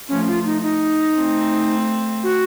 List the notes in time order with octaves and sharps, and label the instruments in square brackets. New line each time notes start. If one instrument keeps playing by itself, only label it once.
[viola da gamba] F3 A3 [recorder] C#4
[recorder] F4
D#4
D#4
[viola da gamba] A3 C4
[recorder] F#4